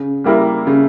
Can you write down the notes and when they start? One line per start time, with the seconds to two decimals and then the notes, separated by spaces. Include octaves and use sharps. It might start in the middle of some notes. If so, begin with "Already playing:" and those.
Already playing: C#3
0.24 G3 A#3 E4 A#4
0.67 C#3